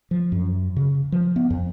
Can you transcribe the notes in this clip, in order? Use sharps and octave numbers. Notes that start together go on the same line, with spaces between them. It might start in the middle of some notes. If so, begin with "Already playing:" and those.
F3
F#2
C#3
F3
B3
F2